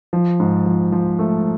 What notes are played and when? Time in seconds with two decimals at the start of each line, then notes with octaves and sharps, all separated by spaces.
0.13 F3
0.40 G#2
0.66 F3
0.92 F3
1.19 A3